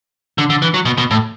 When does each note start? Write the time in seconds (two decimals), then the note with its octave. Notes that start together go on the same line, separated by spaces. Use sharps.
0.38 D3
0.50 D3
0.62 E3
0.74 F#3
0.85 B2
0.98 B2
1.11 A2